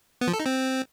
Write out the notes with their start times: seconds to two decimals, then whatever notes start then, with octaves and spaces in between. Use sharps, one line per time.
0.21 B3
0.27 F3
0.33 A4
0.40 D#4
0.46 C4